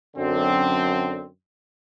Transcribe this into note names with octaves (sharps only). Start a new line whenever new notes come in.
F#2 D3 C4